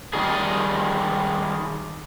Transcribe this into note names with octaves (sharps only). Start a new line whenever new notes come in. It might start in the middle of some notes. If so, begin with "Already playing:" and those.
D#3 G3 G#4